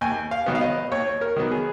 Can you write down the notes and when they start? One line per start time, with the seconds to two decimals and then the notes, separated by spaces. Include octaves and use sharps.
0.01 D#2 G#5
0.31 F5
0.46 D#3 F#3 B3
0.55 F5
0.61 D#5
0.92 D#2 C#5
1.21 A#4
1.36 D#3 F#3 B3
1.51 G#4